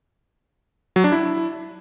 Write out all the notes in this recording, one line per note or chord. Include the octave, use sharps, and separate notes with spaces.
F#3
D4
E4